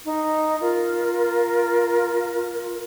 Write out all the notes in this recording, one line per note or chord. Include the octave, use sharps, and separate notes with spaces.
D#4
F4 A#4